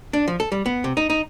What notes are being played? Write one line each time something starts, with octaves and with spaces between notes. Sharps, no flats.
D4
F3
A4
G3
B3
C3
D#4
D#4